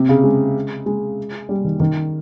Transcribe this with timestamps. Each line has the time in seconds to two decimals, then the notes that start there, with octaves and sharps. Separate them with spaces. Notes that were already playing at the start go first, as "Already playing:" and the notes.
Already playing: C3
0.09 C#3
0.24 G#3
0.86 G#3
1.49 G3
1.64 D#3
1.80 D#3